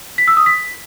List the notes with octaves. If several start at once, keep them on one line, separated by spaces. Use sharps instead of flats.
B6
E6
D#6
B6